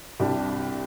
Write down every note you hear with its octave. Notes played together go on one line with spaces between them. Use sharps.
C2 C3 G3 D4 G4